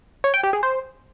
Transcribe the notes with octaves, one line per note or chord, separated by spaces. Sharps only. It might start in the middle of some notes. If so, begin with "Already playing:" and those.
C#5
G5
G4
G#4
C5